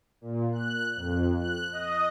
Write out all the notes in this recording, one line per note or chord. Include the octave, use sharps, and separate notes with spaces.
A#2
F#6
F2
F#6
D#5